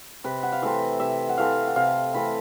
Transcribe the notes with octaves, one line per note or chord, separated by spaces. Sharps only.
C3 B4
F#5
F5
E3 A3 C4 E5
C3 E5
F#5
E3 A3 C4 F5
F#5
C3 F5
E3 A3 C4 B5